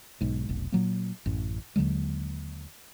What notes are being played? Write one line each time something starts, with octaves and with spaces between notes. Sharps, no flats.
B1 G#2
F1 B1
A#2 F#3 A#3
A1 F#2
D#2 D3 F#3 G#3